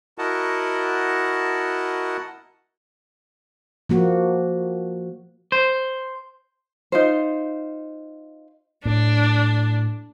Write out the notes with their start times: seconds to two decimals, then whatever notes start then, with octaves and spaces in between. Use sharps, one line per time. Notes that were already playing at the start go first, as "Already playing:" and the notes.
0.18 E4 F#4 A#4 D#5 F#5 A5
3.89 F3 A#3 F#4
5.52 C5
6.92 D#4 F4 C5
8.85 A2 D4